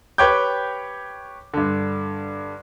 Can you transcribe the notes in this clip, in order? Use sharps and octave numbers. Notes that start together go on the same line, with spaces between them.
G4 B4 C#5 G5 D6 G6
G2 D3